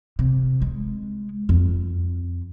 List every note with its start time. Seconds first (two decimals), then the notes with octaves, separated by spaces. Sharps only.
0.19 C3
0.62 G#3
1.49 F2